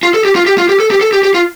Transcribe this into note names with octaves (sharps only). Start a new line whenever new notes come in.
F4
A4
G4
F4
G4
F4
G4
A4
G4
A4
G4
G4
F4